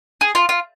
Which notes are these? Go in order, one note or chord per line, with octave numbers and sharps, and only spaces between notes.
G#4
F4
F4